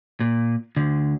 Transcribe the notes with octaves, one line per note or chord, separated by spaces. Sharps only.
A#2
D2 D3